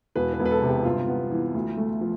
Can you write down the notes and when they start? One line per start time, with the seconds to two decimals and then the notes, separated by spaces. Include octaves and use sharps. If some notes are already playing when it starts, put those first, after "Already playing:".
0.16 E1 B4
0.33 B4
0.39 E1
0.46 B4
0.51 A4
0.62 C3
0.69 G4
0.85 G1 F4
1.08 B3
1.31 E3
1.55 D2
1.77 A3
2.01 F3